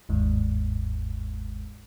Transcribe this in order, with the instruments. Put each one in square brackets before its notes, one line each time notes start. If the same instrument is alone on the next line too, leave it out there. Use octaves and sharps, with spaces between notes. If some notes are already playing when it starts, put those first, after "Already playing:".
[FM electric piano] G1 D#2 G#2